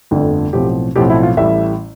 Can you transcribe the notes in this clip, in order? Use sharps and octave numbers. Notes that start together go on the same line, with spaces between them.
G1 F2 D3 A3
B1 A2 F3 C4 G4
B1 A2 F3 C4 G4
E4
F4
A1 A2 G3 E5